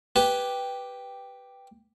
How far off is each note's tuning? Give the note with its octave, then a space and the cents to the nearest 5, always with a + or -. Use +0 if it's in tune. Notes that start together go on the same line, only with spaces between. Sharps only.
G4 +0 B4 +0 G#5 +30